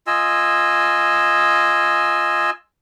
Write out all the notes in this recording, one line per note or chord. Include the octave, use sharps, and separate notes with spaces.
F4 D#5 G#5 E6